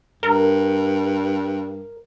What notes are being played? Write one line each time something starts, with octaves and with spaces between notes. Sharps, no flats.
G2 A#4